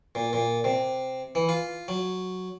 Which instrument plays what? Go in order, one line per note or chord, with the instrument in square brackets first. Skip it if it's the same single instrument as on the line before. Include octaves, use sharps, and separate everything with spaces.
[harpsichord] A#2
A#2
C3
E3
F4
F#3